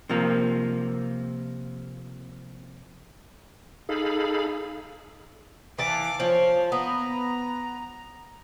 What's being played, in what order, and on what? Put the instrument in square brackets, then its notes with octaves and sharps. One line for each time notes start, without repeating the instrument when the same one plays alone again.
[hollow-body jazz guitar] C3 F3 A#3
[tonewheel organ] D#4 G#4 A4 F5 B5
[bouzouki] E3 A5 [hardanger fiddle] F5 D6
[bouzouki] F3 [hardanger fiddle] C5 C#5
[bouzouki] B3 [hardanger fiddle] A#5